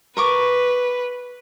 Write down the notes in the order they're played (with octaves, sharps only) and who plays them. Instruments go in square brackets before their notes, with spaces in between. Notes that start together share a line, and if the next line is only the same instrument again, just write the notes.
[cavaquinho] A#4 C#6 D6 [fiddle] B4